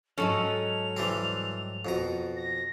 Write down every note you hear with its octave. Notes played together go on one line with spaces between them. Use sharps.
G#2 F#3 C#4 A4 D#5 F7
E3 G3 C4
F2 B2 A#5
A#6